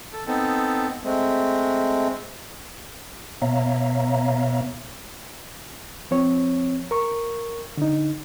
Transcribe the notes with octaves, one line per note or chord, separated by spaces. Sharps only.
A4
B3 C4 D#4 A4
G#3 A3 C4
B2 B3 C#5 E5 F5 A#5
F3 C4 C#5
A#4 C#6
D3 D#4